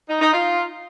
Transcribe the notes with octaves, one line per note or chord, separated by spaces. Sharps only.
D#4
D#4
F4